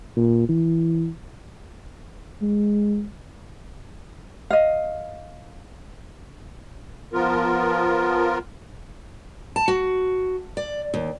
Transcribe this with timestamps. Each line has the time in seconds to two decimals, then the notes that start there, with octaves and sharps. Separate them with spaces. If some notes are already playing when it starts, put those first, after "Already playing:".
0.17 A#2
0.49 E3
2.42 G#3
4.50 D#5 F5
7.13 F3 B3 F4 A#4
9.56 A5
9.68 F#4
10.57 D5
10.94 D#2